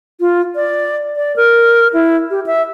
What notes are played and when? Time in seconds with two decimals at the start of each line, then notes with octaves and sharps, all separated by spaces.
0.20 F4
0.55 D5
1.16 D5
1.36 A#4
1.93 E4
2.31 G4
2.46 E5